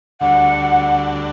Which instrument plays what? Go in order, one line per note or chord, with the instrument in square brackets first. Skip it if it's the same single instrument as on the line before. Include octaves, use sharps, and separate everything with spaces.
[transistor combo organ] D2 D3 G3 D4 F#4 [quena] F#5